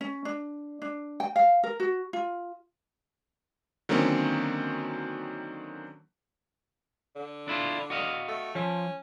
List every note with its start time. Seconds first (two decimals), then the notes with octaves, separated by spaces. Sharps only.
0.01 C#4
0.25 D4
0.82 D4
1.20 G5
1.36 F5
1.63 A#4
1.80 F#4
2.13 F4
3.89 D3 D#3 F#3 A#3 C4 C#4
7.16 D3
7.48 D4 E4 F4
7.90 F#4 D#5 F5
8.28 A3
8.55 F3 C#4